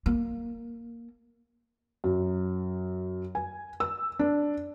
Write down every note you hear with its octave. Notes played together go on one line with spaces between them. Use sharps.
A#3
F#2
G#5
E6
D4